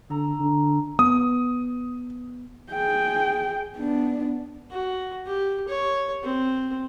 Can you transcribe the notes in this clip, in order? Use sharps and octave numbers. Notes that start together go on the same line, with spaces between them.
D3 A4 A#5
D3
B3 D#6
G#4 G5
B3 D4
F#4
G4
C#5
C4